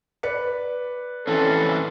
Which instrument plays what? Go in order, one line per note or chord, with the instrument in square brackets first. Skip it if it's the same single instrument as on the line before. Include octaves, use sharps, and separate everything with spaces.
[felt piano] B4 D5 C#7
[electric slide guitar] E3 C4 C#4 [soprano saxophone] A4